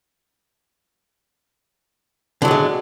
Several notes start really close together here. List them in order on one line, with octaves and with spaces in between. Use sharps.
D3 F#3 A2 G#3